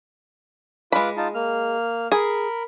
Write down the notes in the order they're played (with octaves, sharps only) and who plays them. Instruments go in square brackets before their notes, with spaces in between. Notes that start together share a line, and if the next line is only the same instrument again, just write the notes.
[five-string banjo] G#3 B5 [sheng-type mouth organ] F4 B4 D6
[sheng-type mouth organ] D#4 F4 A5
A#3 F6
[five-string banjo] G#4 [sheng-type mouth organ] A#4 B5